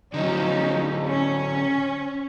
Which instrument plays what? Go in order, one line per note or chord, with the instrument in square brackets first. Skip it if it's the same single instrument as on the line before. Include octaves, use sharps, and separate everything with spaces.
[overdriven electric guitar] D3 F#3 [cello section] F3 C#4 D#4
[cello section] C#4